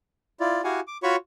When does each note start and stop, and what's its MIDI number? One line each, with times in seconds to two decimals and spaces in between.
0.40 0.62 64
0.40 0.62 65
0.40 0.62 74
0.64 0.80 64
0.64 0.80 66
0.64 0.80 67
0.64 0.80 77
0.64 0.80 78
0.64 0.80 80
0.88 0.97 86
1.03 1.16 65
1.03 1.16 66
1.03 1.16 73
1.03 1.16 83
1.03 1.16 85